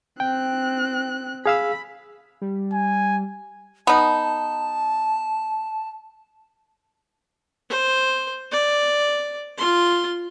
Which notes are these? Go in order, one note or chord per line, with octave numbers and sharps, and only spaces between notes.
C4 G5 F#6
G#4 F5 B5 E6
G3
G#5
B3 D#4 A5
C5
D5
F4 C6